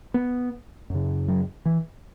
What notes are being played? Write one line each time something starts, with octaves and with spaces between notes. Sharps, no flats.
B3
F#2 C#3
F#3
E3